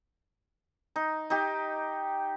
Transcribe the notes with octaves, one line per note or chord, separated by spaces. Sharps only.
D#4
D#4 G4